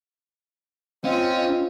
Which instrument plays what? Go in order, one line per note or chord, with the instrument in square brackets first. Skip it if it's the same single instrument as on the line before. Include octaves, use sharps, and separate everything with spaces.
[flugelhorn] C4 [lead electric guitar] C#4 [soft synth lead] F4 [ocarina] D#5